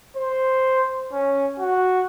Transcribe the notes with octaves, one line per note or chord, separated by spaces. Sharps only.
C5
C#4
F#4